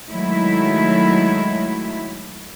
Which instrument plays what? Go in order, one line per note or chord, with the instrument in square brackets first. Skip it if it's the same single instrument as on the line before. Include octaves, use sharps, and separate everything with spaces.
[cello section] D#3 F#3 G#3 A3 E4